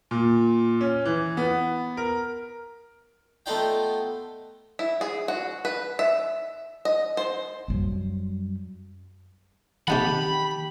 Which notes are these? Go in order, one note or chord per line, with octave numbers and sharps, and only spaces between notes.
A#2
C#4
E3
B3
A#4
A3 B3 D#4 F4 D5 G5
E4
G#4
F#4
B4
E5
D#5
C5
F#2 G3
C3 D#3 D#4 G4 F#5 A5 B5